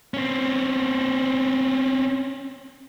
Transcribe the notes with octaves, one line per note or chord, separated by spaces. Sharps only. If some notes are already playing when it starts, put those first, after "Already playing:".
C4 C#4